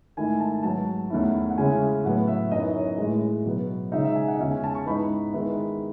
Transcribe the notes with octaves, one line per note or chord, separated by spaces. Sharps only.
G#2 D#3 A3 E4 G#5
A5
G#2 F#3 B3 A5
E2 D#3 A3 C#4 E4
F#5
C#3 G#3 C#4 E4 G#5
A2 F#3 B3 F#5
E5
F#2 E3 B3 D#4 D#5
C#5
A2 E3 G#3
B2 F#3 B3
C#3 G#3 D#4 E5
E5
G#5
F#5
D#5
E2 C#3 G#3 C#4 E5
G#5
A5
C#6
G#2 E3 B3 D#4 B5
D#3 G#3 B3 E4